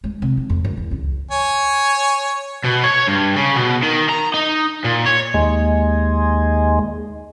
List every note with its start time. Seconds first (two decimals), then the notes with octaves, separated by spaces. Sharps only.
0.04 G#3
0.22 C3
0.37 D#3
0.50 F2
0.65 F#2
0.77 E2
0.91 C#2
1.31 C#5 G#5
2.64 B2
2.83 C#5
3.07 G2
3.36 C#3
3.56 B2
3.83 D#3
4.09 A#5
4.34 D#4
4.85 A#2
5.06 C#5
5.34 D#2 G#3